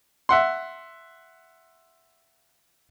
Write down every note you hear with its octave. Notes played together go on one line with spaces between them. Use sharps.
E5 F#5 C6